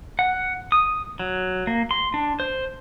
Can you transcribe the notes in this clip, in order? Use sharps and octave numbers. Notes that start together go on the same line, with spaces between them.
F#5
D#6
F#3
A#3
C6
D4
C5